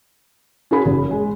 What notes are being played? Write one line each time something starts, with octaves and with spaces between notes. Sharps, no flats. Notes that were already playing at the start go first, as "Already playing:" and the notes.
C#4 F#4 G#4 B5
F#1
G#3